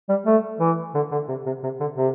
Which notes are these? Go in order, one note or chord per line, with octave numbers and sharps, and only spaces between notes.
G3
A3
E3
D3
D3
C3
C3
C3
D3
C3